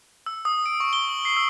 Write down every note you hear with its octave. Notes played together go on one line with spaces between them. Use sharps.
E6
D#6
D7
C#6
G7
F#7
C7
E6